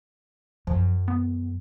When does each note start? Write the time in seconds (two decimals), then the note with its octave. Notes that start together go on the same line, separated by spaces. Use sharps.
0.67 F#2 F3
1.08 B3